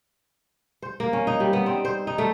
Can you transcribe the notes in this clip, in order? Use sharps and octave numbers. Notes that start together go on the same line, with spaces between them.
C5
A#3
C#4
D#4
G3
B3
C4
C5
D#4
A3